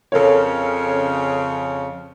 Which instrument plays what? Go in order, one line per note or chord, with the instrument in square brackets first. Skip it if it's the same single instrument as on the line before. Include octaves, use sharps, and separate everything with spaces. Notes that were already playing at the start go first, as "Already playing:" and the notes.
[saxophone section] F2 C#3 [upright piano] A4 A#4 C#5